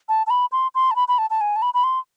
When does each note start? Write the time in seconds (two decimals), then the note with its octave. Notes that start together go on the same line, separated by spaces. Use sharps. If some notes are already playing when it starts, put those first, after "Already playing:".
0.09 A5
0.27 A5
0.30 B5
0.52 C6
0.75 C6
0.91 A5
0.96 B5
1.08 B5
1.18 A5
1.30 A5
1.41 G#5
1.56 A5
1.62 B5
1.74 B5
1.84 C6